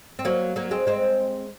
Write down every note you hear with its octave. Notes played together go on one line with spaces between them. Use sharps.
C4
F#3 A#3
F#3 A#3
G#3 C4
G#3 C4